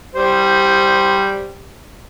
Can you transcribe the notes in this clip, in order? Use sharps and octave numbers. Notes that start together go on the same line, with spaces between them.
G3 C5